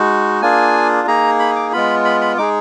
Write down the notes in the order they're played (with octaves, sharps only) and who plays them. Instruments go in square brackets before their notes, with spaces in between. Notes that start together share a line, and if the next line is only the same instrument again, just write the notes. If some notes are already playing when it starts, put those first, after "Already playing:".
Already playing: [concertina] G#3 D#4 F#4
A#3 D4 F4 G#4 G#5
A#3 D#4 G#4 A#5
B5
D6
G#3 B3 F4 B5
B5
B5
G#3 D#4 G#4 D6